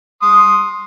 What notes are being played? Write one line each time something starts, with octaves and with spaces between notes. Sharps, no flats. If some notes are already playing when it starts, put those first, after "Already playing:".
C6 D#6